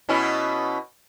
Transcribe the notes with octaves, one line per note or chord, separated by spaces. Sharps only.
B2 C#4 E4